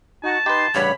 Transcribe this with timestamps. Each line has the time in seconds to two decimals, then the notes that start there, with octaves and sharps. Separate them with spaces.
0.24 D#4 F#4 A5
0.46 D#4 G4 B4 C6
0.75 A1 G2 C#3 C#5 F#5 B5